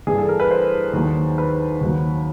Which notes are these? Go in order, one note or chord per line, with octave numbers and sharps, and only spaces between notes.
G2 E3 G#4
A4
A#4
B4
C5
D#2 D#3 F#3
B4
D#2 D#3 F#3